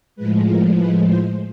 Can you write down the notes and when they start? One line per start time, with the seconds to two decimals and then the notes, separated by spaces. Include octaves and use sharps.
0.16 A2 F3 G#3 B4
0.46 A#4
0.76 B4
1.06 C5